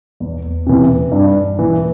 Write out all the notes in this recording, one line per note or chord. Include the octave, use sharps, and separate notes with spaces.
E2
C3 E3
G2
E3